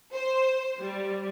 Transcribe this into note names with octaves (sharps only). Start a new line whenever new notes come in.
C5
G3